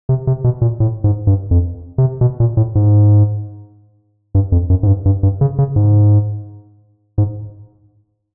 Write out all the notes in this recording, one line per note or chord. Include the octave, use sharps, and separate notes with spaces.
C3
C3
B2
A#2
A2
G#2
G2
F2
C3
B2
A#2
A2
G#2
G2
F2
F#2
G#2
G2
G2
G2
C#3
C#3
G#2
G#2